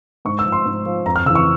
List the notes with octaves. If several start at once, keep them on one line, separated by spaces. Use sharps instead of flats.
G#2 C#6
E6
F3
C6
G#2
F3
F2 A#5
F6
C#3 E3 E6
C#6